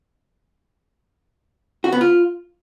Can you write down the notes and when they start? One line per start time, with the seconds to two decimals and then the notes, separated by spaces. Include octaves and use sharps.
1.84 F#4
1.92 B3
2.01 F4